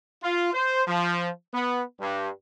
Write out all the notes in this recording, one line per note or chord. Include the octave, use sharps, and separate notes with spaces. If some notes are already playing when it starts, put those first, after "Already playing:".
F4
C5
F3
B3
G2